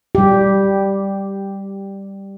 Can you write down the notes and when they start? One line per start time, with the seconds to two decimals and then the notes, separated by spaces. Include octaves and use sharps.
0.15 G3 G4